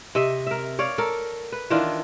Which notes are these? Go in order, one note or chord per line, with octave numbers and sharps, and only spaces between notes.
C3 D#5 E5
A#4 E5
C#5 D5 F5
A4 A#4
B4
D#3 E3 D4 F4